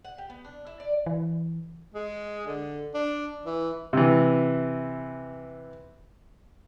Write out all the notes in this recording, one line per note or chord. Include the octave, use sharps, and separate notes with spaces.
F#5
G4
B3
D4
E4
D5
E3
G#3
D3
D4
E3
C3 E3